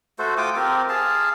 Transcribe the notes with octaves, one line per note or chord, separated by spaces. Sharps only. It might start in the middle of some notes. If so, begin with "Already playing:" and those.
A3 F#4 A4 C5
F4 G5 D6 D#6
C4 G4 A#4
G#4 F5 A5